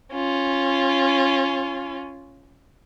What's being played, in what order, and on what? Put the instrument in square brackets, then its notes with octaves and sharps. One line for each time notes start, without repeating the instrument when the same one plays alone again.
[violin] C#4 F4